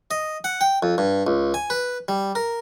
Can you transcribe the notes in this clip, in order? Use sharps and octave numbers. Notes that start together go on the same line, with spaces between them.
D#5
F#5
G5
F2
G2
C#2
G#5
B4
G3
A#4